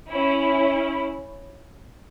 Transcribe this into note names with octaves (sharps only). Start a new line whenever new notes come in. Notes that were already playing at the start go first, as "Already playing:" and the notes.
C#4 E4